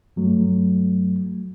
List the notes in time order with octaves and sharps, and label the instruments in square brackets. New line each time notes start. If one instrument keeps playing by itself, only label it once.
[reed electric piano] G2 F#3 A3